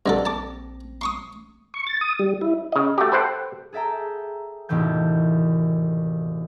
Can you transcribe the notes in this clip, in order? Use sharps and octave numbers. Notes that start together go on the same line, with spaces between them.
A#1 G2 D3 C4 A4 A#6
A5 D6
C6 C#6 D#6
C#6
A6
D#6
G3
E4
C#3 D#5
A3 F#4 G4
A4 B4 C5 F#5 G5
G#4 A4 E5 G5 A#5
E1 D#2 A2 C3 E3 G6